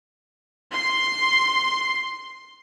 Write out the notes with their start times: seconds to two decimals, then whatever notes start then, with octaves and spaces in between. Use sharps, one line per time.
0.72 C6 C7